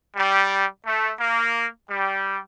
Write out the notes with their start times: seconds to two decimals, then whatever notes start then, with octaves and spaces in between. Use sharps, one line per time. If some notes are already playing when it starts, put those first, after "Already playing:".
0.16 G3
0.85 A3
1.19 A#3
1.89 G3